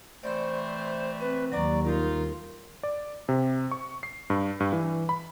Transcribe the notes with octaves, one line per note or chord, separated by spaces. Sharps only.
C3 E3 A3 C5 D5 B5 C6
C4 B4
D#2 F#3 D5 A#5 C#6
G3 D#4 F4 A#4
D5
C3
C#6
C7
G2
G2
E3
B5